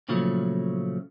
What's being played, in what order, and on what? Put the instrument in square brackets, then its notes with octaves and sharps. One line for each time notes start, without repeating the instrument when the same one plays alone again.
[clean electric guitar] A#2 C#3 F3 F#3 A3